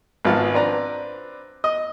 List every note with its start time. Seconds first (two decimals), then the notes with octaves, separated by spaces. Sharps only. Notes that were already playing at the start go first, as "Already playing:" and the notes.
0.25 G#1 F3 B3 F4 F5 A5
0.54 C4 D4 B4 D5 A#5
1.64 D#5